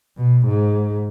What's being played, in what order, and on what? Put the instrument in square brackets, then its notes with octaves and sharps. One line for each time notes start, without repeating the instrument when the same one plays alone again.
[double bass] B2
G#2